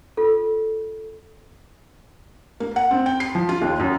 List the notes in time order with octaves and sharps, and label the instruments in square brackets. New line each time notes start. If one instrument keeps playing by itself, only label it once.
[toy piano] F4 A4
[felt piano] A#3
F#5
C4
G5
C7
F3
F4
D#2
F#2